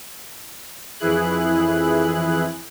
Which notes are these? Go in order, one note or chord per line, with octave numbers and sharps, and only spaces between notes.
F2 E3 E4 G#4 F#6